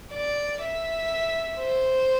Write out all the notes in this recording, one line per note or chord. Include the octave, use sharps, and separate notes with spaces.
D5
E5
C5